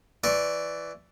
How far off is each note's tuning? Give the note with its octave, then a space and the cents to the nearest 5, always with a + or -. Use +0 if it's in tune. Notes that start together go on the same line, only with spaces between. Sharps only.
E3 +5 D5 +0 C#6 -30